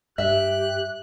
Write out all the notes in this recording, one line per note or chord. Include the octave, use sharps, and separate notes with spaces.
G2 G4 E5 F#6